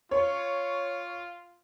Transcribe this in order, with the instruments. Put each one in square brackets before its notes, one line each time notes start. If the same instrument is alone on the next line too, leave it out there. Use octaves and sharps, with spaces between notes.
[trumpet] F4 [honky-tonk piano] C#5